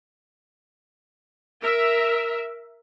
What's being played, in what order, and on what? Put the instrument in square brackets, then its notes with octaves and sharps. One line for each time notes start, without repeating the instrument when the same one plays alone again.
[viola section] A#4 E5